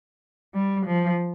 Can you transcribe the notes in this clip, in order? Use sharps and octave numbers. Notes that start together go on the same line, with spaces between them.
G3
F3